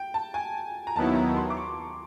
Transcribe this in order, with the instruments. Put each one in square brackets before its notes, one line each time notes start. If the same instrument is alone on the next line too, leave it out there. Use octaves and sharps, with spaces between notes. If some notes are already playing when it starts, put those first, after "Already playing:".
Already playing: [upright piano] G5
A5
G#5
A#5
[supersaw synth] D#2 D#3 F#3 B3 E4 [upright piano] A5
[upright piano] A#5
C6
D6
C#6